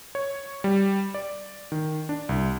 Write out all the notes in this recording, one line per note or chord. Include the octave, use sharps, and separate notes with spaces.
C#5
G3
D5
D#3
D4
C2